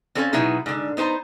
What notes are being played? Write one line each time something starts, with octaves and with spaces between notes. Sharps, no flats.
C4 C#4 A4 F5 G5 G#5
B2 F#3 B3 D#4 E4 G#4
G#2 D3
B3 D#4 C5 A5 A#5